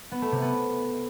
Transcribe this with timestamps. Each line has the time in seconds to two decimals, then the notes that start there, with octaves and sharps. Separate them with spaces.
0.12 B3
0.22 A3
0.32 C3
0.42 B3